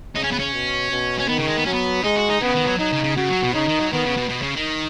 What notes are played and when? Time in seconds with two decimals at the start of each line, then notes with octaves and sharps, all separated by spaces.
0.15 C#3 D#4
0.23 C#4
0.31 B3
0.39 C#4
0.53 B2
0.91 B2
1.19 C#4
1.28 D#3 B3
1.38 C#3
1.47 G#3
1.57 B3
1.65 F#3 C#4
1.73 B3
2.03 G#3 D#4
2.16 F#4
2.29 D#4
2.42 C#3 B3
2.54 D#3
2.67 F#3
2.79 F#3 D#4
2.92 C#3
3.04 C#3
3.16 C#3 F#4
3.30 F#3
3.42 B2
3.54 C#3 D#4
3.68 D#3
3.80 F#3
3.93 D#3 B3
4.05 C#3
4.17 B2
4.30 B2
4.42 C#3
4.56 D#3